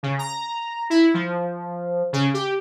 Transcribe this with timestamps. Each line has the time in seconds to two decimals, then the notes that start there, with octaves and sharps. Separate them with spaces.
0.03 C#3
0.19 A#5
0.90 E4
1.14 F3
2.13 C#3
2.34 G4